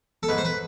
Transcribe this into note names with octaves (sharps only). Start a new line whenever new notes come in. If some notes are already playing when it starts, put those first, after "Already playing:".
A4
G#2 B4
C5
B4